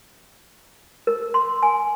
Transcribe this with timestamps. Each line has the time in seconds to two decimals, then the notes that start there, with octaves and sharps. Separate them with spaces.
1.07 A#4
1.34 C6
1.63 G#5